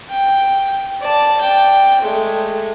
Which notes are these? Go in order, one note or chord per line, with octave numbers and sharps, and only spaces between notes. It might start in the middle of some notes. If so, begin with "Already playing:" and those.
G5
D5 A5
D5 G5
G#3 A3